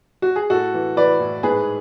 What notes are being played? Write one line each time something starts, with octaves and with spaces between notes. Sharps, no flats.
F#4
G#4
A2 F#4 A4
E3
E3 B4 D5
A2
G#2 G#4 B4